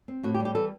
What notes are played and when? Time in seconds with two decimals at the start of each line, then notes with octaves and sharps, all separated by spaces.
0.08 C4
0.23 A2 F#4
0.34 G4
0.40 G3
0.45 G4
0.55 E3 A4